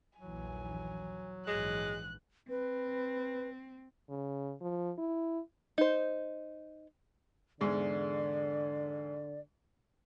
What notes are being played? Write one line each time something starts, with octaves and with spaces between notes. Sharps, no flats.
A#1 D#2 E3 F#3 G#5
A#1 G#2 E3 G#3 F#6
C4 B4
C#3
F3
E4
D#4 C5
E2 G#2 D3 G#3 D5